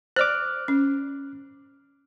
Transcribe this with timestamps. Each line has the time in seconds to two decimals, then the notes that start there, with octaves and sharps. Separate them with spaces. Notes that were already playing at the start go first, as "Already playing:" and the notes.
0.16 C5 D5 D6 F6 F#6
0.68 C#4